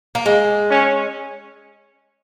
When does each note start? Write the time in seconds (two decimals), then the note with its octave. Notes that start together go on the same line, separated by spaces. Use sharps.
0.15 A#3
0.26 G#3
0.71 C#4